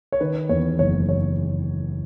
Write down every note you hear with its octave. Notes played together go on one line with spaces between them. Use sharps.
C#5
D#3 B4
E2 C#5
F#1 C#5
C#5